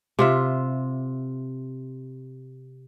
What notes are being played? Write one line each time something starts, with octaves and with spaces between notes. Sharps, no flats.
C3 F4 E5